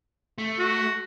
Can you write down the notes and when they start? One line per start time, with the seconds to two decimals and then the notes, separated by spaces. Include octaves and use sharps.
0.38 A3
0.59 F#4